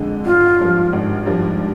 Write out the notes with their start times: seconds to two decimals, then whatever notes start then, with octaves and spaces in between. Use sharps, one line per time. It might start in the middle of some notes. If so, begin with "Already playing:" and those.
Already playing: F2 D3 G#3
0.25 G#1 F4
0.59 G2 F3
0.93 G#1
1.26 G2 F3